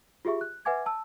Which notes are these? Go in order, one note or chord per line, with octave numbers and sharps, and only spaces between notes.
F4 G4 G#4 E5 C#6
F#6
B4 E5 F#5 G#5 D6 G#6
A5 E6